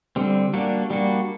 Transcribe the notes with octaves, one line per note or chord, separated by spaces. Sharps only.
D3 G3 C4
G3 A#3 D4 F#4
G3 A#3 D4 F#4